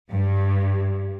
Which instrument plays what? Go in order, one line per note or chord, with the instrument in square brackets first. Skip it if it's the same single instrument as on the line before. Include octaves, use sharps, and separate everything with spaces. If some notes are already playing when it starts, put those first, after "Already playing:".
[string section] G2